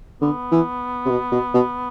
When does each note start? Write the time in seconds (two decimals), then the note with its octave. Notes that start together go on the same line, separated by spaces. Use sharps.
0.22 D3 B3
0.52 E3
1.05 C3
1.10 B2
1.32 B2
1.54 B2